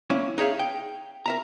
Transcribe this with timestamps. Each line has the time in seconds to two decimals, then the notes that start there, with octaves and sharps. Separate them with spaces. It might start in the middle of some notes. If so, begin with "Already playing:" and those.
0.10 A#3 C#4 E4
0.38 D#4 G#4 C#5 E5 F5
0.59 G5
1.26 A#4 E5 A#5